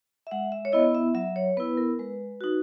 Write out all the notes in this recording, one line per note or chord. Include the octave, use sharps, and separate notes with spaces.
E5
G#3 F#5
E5
C#5
B3 E4 D#5
E5
F#3 E5
C#5
B3 E4 B4
A#4
G#3 B4
D#4 F#4